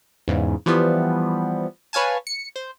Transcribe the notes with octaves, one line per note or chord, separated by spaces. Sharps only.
E2 G#2 C#3
E3 F3 G3 B3
B4 C#5 F5 G#5 A5
C#7
C5